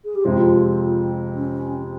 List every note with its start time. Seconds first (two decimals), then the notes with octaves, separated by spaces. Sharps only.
0.05 G#4
0.15 G4
0.24 F2 C3 F3 G#3 C4 F4
1.35 C#4